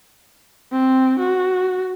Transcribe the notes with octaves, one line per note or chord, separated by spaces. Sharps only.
C4
F#4